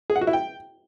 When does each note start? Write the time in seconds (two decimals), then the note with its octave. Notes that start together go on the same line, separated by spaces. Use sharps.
0.10 G#4
0.16 F#5
0.21 F#4
0.27 E4
0.33 G5